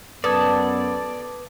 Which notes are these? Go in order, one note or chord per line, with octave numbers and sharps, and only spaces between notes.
F#2 B3 A4 B4 D5 D#6 G#6